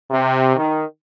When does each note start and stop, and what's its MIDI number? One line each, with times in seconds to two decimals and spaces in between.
0.11 0.55 48
0.56 0.83 51